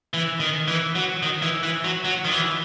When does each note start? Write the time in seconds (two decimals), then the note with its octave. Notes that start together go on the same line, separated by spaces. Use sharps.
0.14 E3
0.40 D#3
0.68 E3
0.95 F#3
1.23 D#3
1.42 E3
1.63 E3
1.84 F#3
2.05 F#3
2.25 D#3
2.31 E3